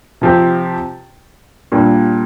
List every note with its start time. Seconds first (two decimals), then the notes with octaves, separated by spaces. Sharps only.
0.21 C3 F3 C4 G4
1.72 A#2 G3 D4